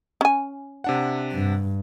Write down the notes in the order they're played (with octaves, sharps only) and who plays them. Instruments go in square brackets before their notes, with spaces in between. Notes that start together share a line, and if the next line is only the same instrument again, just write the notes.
[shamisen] C#4 G#5
[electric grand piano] C3 D4 F#5
[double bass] G2